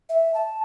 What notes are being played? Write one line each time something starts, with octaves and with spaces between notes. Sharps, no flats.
E5
A5